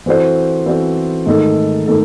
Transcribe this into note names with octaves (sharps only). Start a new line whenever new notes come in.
E3 C4 F#4 A4 C5
E3 C4 F#4 A4 C5
G#2 D#3 A3 D#4 A4
D#3 A3 D#4 A4